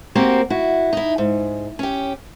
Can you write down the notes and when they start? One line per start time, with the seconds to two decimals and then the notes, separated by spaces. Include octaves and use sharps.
0.15 A#3 C4 F#4 G4 A#4
0.50 E4 F#4
0.93 D#4 E4
1.18 G#2
1.79 C#4 G4